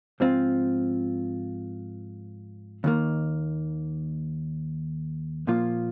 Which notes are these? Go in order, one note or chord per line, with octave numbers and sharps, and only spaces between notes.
G#2 F3 C4 F4
D#2 D#3 A#3
A#2 F3 A#3 F4